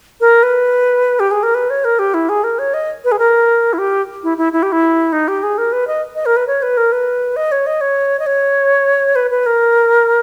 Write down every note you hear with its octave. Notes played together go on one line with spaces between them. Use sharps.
A#4
B4
G4
G#4
A#4
B4
C#5
A#4
G4
E4
G#4
A#4
C#5
D#5
B4
G#4
A#4
E4
G4
E4
E4
E4
G4
E4
D#4
G4
G#4
A#4
B4
D#5
D#5
A#4
B4
C#5
B4
A#4
B4
D#5
C#5
D#5
C#5
D#5
C#5
B4
B4
A#4